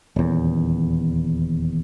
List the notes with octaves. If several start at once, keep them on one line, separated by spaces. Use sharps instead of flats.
D#1 E2